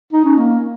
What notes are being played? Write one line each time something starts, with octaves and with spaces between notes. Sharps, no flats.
D#4
C#4
A#3